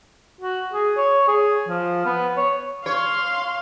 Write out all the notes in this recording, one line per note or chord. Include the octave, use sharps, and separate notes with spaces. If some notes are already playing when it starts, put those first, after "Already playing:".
F#4
G#4
C#5
G#4
F3
B3
C#5
C#5 F5 C6